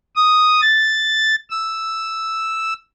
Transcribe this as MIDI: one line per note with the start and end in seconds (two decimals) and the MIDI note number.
0.16 0.61 87
0.61 1.35 93
1.50 2.73 88